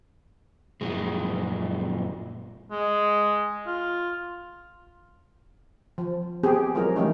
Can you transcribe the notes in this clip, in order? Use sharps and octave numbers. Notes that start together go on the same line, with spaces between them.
F#2 A#2 F3 F#3 G#3
G#3
F4
F3
B3 C4 G4 G#4
F3 F#3 G#3 E4 A#4
E3 G3 A3 A#3 C#4 D#4